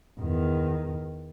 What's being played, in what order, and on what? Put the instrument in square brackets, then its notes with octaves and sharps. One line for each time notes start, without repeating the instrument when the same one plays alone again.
[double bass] E2 D#3